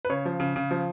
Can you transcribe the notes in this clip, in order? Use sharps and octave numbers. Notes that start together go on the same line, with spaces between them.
B4
C#3 C#5
F3
C#3
C#3
F3